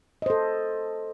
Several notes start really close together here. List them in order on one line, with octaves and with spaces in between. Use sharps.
D#5 C5 A4